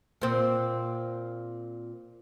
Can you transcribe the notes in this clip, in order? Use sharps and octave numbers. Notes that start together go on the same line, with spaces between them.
A#2 C4